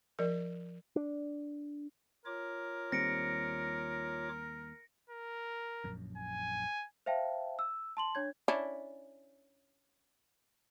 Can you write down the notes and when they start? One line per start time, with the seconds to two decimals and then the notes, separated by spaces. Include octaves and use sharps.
0.19 F3 A#4 D5
0.96 D4
2.25 F4 A#4 C#5 D6
2.92 D#2 G3 C4 A#6 C#7 D7
5.10 A#4
5.84 A#1 F#2
6.17 G#5
7.06 C5 E5 F5 G5 A5
7.59 E6
7.97 A5 C6 F#7
8.15 D4 C#5 G#6
8.48 C#4 D4 E4